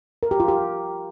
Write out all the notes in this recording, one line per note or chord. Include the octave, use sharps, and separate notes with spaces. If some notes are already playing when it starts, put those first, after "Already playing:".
A#4
G4
F4
G4